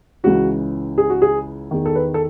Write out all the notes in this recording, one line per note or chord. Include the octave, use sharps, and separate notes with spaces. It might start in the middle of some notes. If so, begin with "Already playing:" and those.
C#2 C#3 E3 F#4
G#4
F#4
G#4
E2 D#3
A4
B4
A4